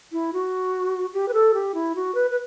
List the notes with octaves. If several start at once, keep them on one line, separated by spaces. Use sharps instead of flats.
E4
F#4
G4
B4
A4
G4
E4
F#4
B4
B4